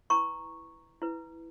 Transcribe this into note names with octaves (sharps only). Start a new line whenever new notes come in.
E4 B4 A#5 C#6
E4 B4